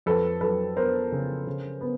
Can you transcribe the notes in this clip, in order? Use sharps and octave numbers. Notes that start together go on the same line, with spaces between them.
F2 A4 B4
F#3 A4 B4
B3 A#4 C5
C#3
C#3
B3